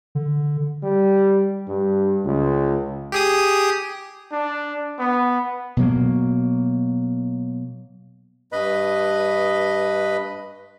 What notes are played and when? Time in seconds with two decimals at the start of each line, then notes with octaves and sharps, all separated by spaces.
0.15 D3
0.83 G3
1.68 G2
2.25 C#2
3.12 G4 G#4 D#6
4.32 D4
4.99 B3
5.77 B2 F#3 A#3
8.52 G2 B4 D#5 B5